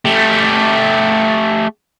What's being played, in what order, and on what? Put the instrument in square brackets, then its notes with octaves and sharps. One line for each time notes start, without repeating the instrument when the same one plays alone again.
[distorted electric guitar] A3 G4